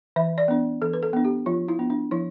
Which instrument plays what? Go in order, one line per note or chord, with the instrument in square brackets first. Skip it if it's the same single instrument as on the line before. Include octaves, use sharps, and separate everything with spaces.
[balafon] E3 E5
D5
B3 D4
E3 A4
B4
A4
B3 D4
G4
F3 F4
E4
B3 D4
D4
F3 E4